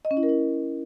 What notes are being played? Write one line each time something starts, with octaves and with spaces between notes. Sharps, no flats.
D#5
C#4
E4
A#4
E4